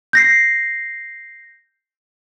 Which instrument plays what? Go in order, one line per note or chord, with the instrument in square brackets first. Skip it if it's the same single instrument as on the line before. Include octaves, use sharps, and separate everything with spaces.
[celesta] G6 A#6 C7